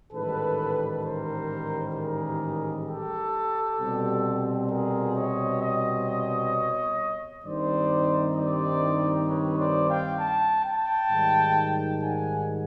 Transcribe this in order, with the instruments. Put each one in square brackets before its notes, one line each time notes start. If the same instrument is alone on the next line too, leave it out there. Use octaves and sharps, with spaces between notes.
[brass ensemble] A1 G#2 D#3 G3 A4 B4
A#4 C5
G#4 A#4
G4 A4
C2 B2 G3 C4
G#4 A#4
C#5 D#5
C#5 D#5
G2 D#3 G3 C4 D#4 C5 D5
C5 D5
B4 C#5
C5 D5
F5 G5
G5 A5
G5 A5
G#2 D#3 G3
F#5 G#5